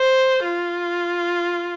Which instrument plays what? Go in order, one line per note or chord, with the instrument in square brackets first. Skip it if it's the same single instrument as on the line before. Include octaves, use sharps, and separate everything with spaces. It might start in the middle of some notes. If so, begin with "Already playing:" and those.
Already playing: [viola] C5
F4